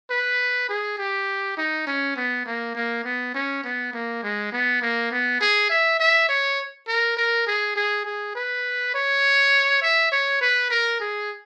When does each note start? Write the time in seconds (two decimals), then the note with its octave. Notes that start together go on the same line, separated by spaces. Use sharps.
0.10 B4
0.69 G#4
0.98 G4
1.57 D#4
1.87 C#4
2.16 B3
2.46 A#3
2.75 A#3
3.04 B3
3.34 C#4
3.64 B3
3.93 A#3
4.23 G#3
4.52 B3
4.82 A#3
5.11 B3
5.41 G#4
5.70 E5
6.00 E5
6.29 C#5
6.87 A#4
7.17 A#4
7.47 G#4
7.76 G#4
8.05 G#4
8.35 B4
8.94 C#5
9.82 E5
10.12 C#5
10.41 B4
10.70 A#4
11.00 G#4